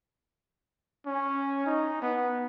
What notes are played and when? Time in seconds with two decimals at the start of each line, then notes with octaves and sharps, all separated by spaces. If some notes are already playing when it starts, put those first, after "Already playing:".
1.06 C#4
1.66 D#4
2.02 B3